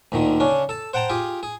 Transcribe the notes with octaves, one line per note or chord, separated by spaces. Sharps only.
D2 A#2 D3 D#3
C#3 C#4 D4
A4 A5
C5 F#5 G5 A5 A#5
F4 G4 G#4
G#4